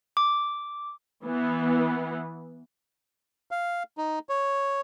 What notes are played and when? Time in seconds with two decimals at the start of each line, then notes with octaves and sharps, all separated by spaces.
0.17 D6
1.24 E3 B3
3.51 F5
3.98 D#4
4.29 C#5